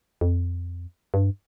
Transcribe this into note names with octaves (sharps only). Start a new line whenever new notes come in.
F2
G2